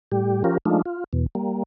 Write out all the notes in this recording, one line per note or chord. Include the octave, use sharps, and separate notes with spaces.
A2 G3 G4
F3 C#4 F4 G4 A#4
F3 G#3 A3 D4 D#4 F4
F4
E2 B2
G3 A#3